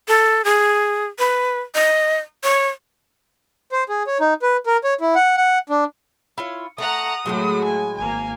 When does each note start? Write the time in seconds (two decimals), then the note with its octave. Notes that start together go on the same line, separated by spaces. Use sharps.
0.08 A4
0.45 G#4
1.19 B4
1.75 D#5
2.44 C#5
3.72 C5
3.89 G#4
4.07 C#5
4.20 D#4
4.42 B4
4.66 A#4
4.84 C#5
5.01 E4
5.15 F#5
5.37 F#5
5.69 D4
6.38 E4 F4 C#5
6.78 A3 F#5 A#5 D#6
7.26 A2 F3 F#3 G#3 A3 F#4
7.64 G#5
7.98 G#1 A#3 G#5